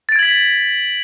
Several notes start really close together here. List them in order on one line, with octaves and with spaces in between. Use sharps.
A6 D7 G#6 F#7 B6